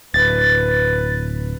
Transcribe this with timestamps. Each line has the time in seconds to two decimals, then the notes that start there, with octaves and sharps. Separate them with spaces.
0.14 D1 B4 A6